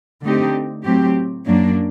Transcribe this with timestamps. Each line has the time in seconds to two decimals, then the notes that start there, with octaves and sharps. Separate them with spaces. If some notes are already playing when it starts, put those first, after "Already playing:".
0.23 D3 A3 C4 D#4 G4
0.84 A2 F#3 C4 G4
1.46 F#2 F#3 A#3 D4